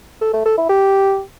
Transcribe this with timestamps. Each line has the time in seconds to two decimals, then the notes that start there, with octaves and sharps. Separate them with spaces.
0.21 A4
0.33 A3
0.45 A4
0.57 E4
0.69 G4